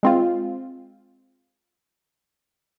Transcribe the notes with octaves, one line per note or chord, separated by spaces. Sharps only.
G#3 C4 F4